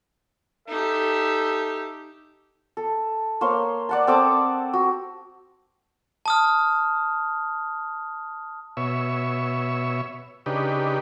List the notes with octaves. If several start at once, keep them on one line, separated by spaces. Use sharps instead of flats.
D#4 G4 A4 E5
A4
A#3 C5 C#5 C6
D5 F#5 A5
C4 A4 D6 D#6
F#4
A5 D#6 F6
B2 C#5 E5
C#3 D4 D#4 G4 B4